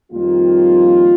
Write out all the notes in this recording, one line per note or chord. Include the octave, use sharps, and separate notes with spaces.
F2 D#3 G3 A#3 F4